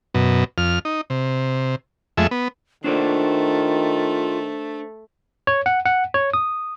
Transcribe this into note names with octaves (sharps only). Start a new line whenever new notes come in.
F#2 B2
F2 F6
D#4
C3
F2 G#3 A3 E5
B3
D#3 A3 D4 F4 C5 D5
C#5
F#5
F#5
C#5
D#6